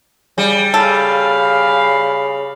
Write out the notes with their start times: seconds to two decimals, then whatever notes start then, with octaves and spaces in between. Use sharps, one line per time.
0.38 C#3 G3
0.74 C#3 A4 F5 B5